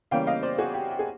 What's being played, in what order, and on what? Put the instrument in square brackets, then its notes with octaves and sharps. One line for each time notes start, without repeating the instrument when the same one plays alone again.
[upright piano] C#3 E3 G3 A#3 C#4 F5 G5
D#5 F5
C5 D5
F#4 G#4
G4
G4
G#4